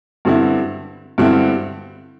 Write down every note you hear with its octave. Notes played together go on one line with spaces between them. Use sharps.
G2 D3 C4 E4
G2 D3 C4 E4